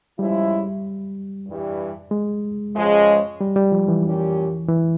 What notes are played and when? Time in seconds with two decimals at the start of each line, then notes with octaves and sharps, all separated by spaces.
0.19 C#3 F3 G3 G#3 E4
1.47 G2 E3 G3
2.11 G#3
2.76 C#3 F3 G#3
3.41 G3
3.56 G3
3.72 F3
3.88 E3
4.04 A#2 G3 C#4 G4
4.68 E3